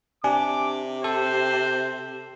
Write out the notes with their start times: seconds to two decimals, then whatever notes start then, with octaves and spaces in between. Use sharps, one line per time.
0.24 C3 D4 G#5 D6
1.04 A4 C5